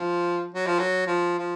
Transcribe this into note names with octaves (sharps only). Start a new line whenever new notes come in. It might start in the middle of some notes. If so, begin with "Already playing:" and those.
Already playing: F3
F#3
F3
F#3
F3
F3